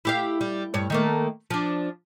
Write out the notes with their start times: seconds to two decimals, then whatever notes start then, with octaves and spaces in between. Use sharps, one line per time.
0.05 E4 G4 F5
0.41 G3
0.74 G2 C#5
0.90 D#3 A3 A#3
1.50 F3 D4